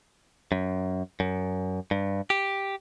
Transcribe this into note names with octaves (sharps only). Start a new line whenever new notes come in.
F#2
F#2
G2
G4